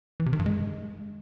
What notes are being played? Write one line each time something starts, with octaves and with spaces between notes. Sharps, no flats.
E3
C3
D#3
G2
G#3